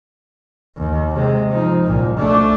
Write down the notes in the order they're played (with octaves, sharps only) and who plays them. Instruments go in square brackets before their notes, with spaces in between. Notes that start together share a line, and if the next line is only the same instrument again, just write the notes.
[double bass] D#2
C3 G#3
F3 D#4
C2 A#2
A3 D4